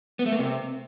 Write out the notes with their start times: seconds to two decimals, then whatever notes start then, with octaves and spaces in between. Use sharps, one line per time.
0.19 B3
0.26 A3
0.32 A#3
0.39 C3